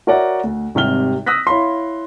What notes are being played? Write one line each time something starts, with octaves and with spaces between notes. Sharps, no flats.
F#4 A#4 C#5 D5 E5 F#5
D2
G#1 C3 G3 F6 G7
D#6 E6 F#6 A#6 B6
E4 C#5 F5 B5 C6